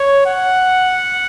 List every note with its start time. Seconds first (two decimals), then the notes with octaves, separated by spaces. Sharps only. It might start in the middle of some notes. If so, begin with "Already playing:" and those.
Already playing: C#5
0.27 F#5